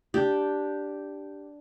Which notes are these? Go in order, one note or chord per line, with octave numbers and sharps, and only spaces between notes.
D4 G4